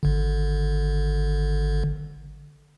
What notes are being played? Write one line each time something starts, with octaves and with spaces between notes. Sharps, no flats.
G#1 D3